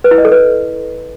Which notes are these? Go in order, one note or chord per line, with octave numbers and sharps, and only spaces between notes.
B4
E4
D#5
A4
B4